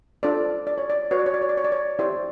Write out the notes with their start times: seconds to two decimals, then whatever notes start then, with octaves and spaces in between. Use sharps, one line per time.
0.23 D4 F4 A4 C5 D5
0.67 D5
0.78 C#5
0.90 D5
1.11 F#4 B4 C#5
1.19 D5
1.26 C#5
1.34 D5
1.42 C#5
1.49 D5
1.57 C#5
1.64 D5
1.72 C#5
1.99 E4 G4 C5 D5